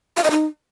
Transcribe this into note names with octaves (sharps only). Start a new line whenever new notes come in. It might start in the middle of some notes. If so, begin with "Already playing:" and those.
F5
D#5
D#4